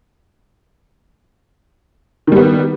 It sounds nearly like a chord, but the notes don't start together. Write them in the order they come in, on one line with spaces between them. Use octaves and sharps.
D#3 G3 B3